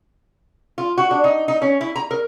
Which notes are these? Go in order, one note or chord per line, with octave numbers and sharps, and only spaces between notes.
F4
F#4
D4
D#4
D#4
C#4
E4
A#5
A#4